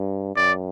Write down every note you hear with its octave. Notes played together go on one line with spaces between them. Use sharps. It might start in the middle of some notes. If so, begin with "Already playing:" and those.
Already playing: G2
F#2 D5